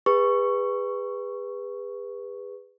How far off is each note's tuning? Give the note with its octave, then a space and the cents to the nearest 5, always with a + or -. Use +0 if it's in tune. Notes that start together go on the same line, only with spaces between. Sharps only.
G#4 -35 B4 +0 C#6 +0